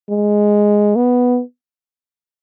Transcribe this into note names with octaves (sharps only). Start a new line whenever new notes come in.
G#3
B3